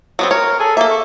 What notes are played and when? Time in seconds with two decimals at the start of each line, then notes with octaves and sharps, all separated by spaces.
0.19 F#3 B3 C4
0.31 A#4 C#5
0.60 G#4 A4 G#5
0.77 A#3 A4 E5
0.91 C#6